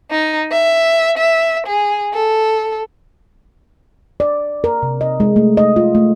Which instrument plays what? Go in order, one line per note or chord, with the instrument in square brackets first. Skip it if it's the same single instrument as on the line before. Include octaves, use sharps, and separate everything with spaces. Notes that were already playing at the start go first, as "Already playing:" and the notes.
[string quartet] D#4
E5
E5
G#4
A4
[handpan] D5
A#4
C3
D#5
G#3
A3
D#5
F4
A3